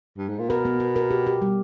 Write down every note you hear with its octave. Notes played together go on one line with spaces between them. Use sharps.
G2
G#2
A#2
B2 A#4
B3
A#4
A#4
G4
G4
G3